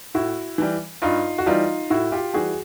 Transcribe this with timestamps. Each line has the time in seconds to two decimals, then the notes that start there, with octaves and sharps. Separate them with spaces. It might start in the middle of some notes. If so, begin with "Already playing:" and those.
0.14 A2 E4 F#4
0.58 E3 G3
1.02 G2 D#4 F4
1.38 F#4
1.46 E3 G3 D#4 F4
1.90 A2 E4 F#4
2.12 F4 G4
2.33 E3 G3 F#4 G#4